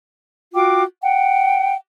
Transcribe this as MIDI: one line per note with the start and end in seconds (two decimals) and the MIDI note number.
0.54 0.83 65
0.54 0.83 66
0.54 0.83 79
0.54 0.83 86
1.02 1.73 78
1.02 1.73 79